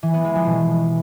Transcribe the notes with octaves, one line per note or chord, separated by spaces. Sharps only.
E3
B3
G#3
F3
B2